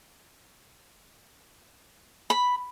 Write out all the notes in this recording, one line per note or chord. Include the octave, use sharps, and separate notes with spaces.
B5